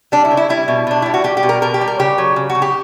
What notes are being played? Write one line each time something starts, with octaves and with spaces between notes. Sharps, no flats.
G3 D4
E4
C#3
E4
G3 E4
B2
B2 D4
G3 E4
F#4
G3 G4
G4
B2
A#4
B2 A#4
G4
G3
A#4
C#3 G4
F#3
C#3
F#4
C#3
G4